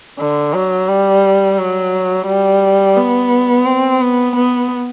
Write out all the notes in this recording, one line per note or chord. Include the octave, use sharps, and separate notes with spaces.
D3
F#3
G3
F#3
G3
B3
C4
B3
B3